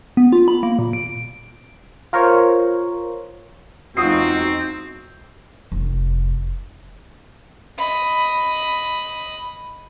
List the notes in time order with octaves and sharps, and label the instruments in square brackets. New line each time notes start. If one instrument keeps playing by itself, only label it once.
[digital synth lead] B3
F4
B5
A#3
A#2
D7
[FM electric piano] F4 A#4 C5 C#5
[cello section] E2 G#3 D#4 [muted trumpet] C4 [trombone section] F4 F#4 [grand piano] D#6 C7
[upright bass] F1
[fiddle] D#5 B5